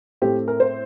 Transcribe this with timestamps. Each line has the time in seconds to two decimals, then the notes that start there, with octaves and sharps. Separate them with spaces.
0.22 A2 A3 C4 G4
0.48 A#4
0.60 C5